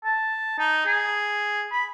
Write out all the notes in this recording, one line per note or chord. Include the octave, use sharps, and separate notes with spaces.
A5
D#4
G#4
B5